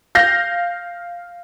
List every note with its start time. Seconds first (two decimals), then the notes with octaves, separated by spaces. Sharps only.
0.15 F5 G6 A#6